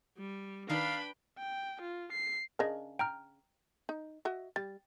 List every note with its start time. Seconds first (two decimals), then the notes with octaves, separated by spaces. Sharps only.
0.17 G3
0.70 D#3 D4 D#4 B4 F5 G5 B5
1.39 G5
1.82 F4
2.12 C7
2.59 C#3 D4 A#4 D#5
2.99 G5 A#5 F6
3.89 D#4
4.25 F#4 D#5 E5
4.56 G3 A6